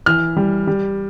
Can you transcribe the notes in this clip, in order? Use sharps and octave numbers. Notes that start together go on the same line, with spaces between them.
E3 F6
G3
G3